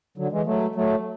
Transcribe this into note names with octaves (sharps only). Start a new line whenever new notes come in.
D3 F#3
E3 G#3
F#3 A3
F#3 A3